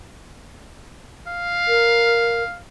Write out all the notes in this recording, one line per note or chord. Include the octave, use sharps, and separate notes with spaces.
F5
A#4